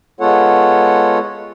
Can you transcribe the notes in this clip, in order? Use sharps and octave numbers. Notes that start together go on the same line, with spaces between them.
G#3 B3 F4 A4 C#5 F#5